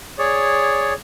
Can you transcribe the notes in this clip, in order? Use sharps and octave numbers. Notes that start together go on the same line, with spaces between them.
G#4 C#5 D5